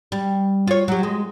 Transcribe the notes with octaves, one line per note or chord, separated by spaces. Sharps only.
G3
F4 C#5
F#3 G4
G#3